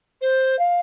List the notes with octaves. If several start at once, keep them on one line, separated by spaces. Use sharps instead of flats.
C5
F5